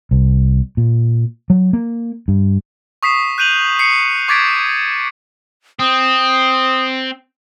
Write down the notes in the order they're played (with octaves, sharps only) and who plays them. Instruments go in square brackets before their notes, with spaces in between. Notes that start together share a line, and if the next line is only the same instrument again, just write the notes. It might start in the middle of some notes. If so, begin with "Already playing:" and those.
[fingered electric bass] C2
A#2
F#3
A#3
G2
[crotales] C#6 D#6 B6 C7 E7
F#6 G6 D#7 F7 F#7
C7 C#7
C#6 D6 G#6 A6 B6 D7
[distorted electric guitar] C4 [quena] D#6